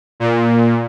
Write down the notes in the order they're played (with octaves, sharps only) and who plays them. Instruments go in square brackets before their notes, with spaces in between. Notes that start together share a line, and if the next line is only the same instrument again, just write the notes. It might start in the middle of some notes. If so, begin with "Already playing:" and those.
[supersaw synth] A#2